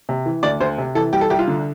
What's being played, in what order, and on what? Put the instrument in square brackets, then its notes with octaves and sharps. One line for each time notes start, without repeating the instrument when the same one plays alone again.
[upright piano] C3
E3
D2 D5
D2 C5
C3
E3 A4
G3 G4
A4
C2 G4
F4
D3